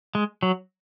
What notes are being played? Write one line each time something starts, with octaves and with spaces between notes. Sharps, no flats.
G#3
F#3